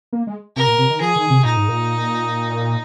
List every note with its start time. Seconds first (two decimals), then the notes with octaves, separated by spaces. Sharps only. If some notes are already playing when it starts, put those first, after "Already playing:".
0.13 A#3
0.27 G#3
0.56 C3 A#4
0.67 A#2
0.78 C3
0.90 D#3
1.00 F3 G#4
1.16 D#3
1.30 C3
1.45 A#2 D#4
1.56 G#2
1.68 A#2